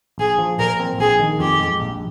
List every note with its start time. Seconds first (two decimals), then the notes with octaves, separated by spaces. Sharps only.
0.18 A#1 G#4
0.38 F3
0.58 A#2 A#4
0.79 C4
0.98 A#1 G#4
1.19 D#3
1.39 F2 G4
1.60 G#3
1.80 A#1